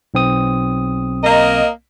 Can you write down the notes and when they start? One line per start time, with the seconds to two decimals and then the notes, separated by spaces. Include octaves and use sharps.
0.14 B1 C4 D#6
1.24 A#3 A#4 D#5